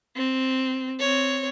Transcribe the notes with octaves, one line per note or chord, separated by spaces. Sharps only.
C4
C4 C#5